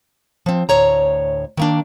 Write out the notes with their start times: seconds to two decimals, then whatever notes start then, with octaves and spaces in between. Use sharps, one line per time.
0.46 F3 C4
0.69 D2 A2 C#5 A#5
1.57 D#3 A#3 D4